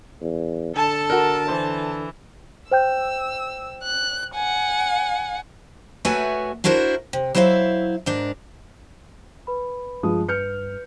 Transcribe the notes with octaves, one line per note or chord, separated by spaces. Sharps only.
E2
D3 A4 A5
F#4 A#4
E3 C5
C5 G5 E6 G6
F#6
F#5 G#5
A3 F#4 B4 C#5 E5 G#5
D4 E4 F#4 A#4 C5
C3
F#3 E4 C5 E5 F5
G#2 D4 A#4
B4 B5
G2 F3 G#3 D#6
B4 F6 G6 C#7